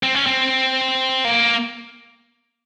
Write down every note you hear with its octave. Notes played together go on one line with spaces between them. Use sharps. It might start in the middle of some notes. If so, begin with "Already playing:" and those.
C4
C#4
C4
A#3